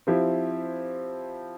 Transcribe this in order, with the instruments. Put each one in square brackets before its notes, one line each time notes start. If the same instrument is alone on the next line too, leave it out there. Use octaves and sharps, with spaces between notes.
[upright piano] F3 C4 E4 G4